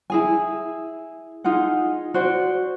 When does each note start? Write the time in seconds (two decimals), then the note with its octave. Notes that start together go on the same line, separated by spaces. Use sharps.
0.10 E4 G#4 G#5
1.44 D#4 F4 G#4 F#5
2.14 F#4 C5 D5